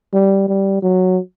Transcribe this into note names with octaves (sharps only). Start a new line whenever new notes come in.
G3
G3
F#3